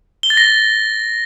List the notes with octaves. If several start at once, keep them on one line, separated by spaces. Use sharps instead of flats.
G7
A6
A#6